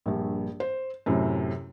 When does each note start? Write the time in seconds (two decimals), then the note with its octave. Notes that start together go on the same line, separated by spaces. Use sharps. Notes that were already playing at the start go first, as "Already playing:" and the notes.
0.06 A#1 G2
0.60 C5
1.06 F#2 A2 C3